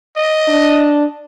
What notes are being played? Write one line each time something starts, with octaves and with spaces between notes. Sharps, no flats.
D#5
D4